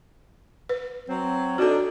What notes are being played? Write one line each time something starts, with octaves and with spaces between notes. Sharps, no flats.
B4
F#3 C4
D4 D#4 F#4 A4